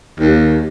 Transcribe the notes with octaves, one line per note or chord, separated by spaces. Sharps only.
D#2